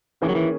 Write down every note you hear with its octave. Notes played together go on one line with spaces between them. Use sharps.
D#3 E3 A#3 C#4 G#4
F#3
E3